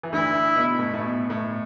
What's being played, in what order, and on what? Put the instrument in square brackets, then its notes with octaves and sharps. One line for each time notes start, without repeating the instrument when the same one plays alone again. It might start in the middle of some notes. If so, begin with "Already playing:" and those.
[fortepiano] E3
[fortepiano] D2 D3 [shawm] E4
[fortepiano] B2
A2
A2
B2
A2